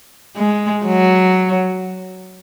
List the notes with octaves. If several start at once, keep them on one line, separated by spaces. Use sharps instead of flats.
G#3
F#3